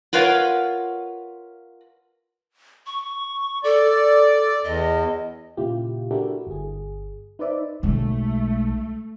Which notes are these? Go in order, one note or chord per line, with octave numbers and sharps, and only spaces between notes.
F4 A#4 B4 C#5 F5 F#5
C#6
A4 D5
E2 D#5
A#2 C#3 E4 F4 G4
D4 E4 F#4 G4 A4 A#4
G1 G#4
D#4 B4 C5 D5 E5
B1 G#3 A3